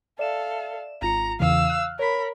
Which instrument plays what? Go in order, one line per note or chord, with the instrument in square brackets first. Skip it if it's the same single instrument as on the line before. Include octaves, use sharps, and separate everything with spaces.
[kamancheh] A4 F5 [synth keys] D5 E5 E7
[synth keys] G#1 F4 C#7 [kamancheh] A#5
[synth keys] E2 C#3 E3 [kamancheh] F5 E6
[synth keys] F6 F#6
[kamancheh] A#4 B5 [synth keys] C#5 B6